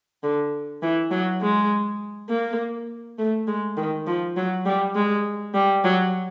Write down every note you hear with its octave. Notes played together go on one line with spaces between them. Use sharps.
D3
E3
F#3
G#3
A#3
A3
G#3
D#3
F3
F#3
G3
G#3
G3
F#3